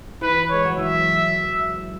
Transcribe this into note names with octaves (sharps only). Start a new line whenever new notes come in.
E3 B4
G#3 C#5
F#3
E3 E5